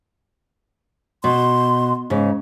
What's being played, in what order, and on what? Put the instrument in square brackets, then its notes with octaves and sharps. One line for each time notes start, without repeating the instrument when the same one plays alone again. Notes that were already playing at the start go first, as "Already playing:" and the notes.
[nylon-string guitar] B2 [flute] C6
[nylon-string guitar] G#2 C#3